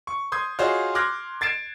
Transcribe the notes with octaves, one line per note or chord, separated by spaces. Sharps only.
C#6
C6 D#6 G6 G#6
F4 F#4 G#4 C5 C#5 D#5
C6 D6 F6 F#6 G#6 A#6
G#6 A6 C7 D7 E7